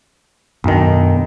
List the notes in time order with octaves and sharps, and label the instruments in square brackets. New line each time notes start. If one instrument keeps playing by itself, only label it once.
[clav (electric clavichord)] B1 D#3 [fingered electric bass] F#2 D4